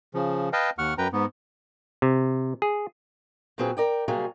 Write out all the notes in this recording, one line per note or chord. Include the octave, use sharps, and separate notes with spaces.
C#3 F3
B4 D#5 F5 G5 A5
D#2 F#5 C#6 F6
F#2 B4 G5 A#5
G#2 B3
C3
G#4
A#2 F#3 C4 G#4 B4
A#4 D5 G5
C3 F#3 G3 A#3 G#4